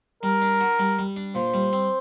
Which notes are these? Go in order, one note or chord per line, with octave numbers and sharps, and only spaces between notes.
G3 A#4
D4
F#4
G3
G3
D4
A#2 C5
G3
C4